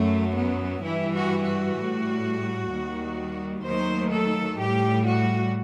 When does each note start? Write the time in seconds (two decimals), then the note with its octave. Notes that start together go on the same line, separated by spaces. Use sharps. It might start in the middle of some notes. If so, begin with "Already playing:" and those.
Already playing: F#2 F#3 A3
0.36 B3
0.83 G2 E3 G3 E4
1.14 F#4
1.46 F#4
1.78 A2 G3
2.70 D#2 D#3 G3
3.64 D#2 D#3 F#3 A3 C5
4.11 A4
4.58 A2 G3 G4
5.05 F#4